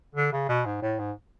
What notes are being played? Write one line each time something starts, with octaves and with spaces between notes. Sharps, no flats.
D3
C#3
B2
G#2
A2
G#2